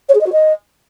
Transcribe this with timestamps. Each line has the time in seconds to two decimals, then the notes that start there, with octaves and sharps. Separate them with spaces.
0.09 C#5
0.15 G#4
0.21 D#5
0.27 F#4
0.32 D#5